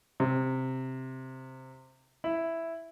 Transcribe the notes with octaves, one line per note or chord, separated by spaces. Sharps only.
C3
E4